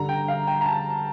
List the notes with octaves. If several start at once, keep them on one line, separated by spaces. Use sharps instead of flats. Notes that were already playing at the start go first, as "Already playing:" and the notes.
Already playing: G2 D3 G3 A#5
G5
F5
G5
A#5
A5